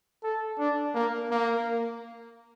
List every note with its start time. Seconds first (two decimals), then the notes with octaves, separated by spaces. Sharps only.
0.23 A4
0.59 D4
0.95 A#3
1.31 A#3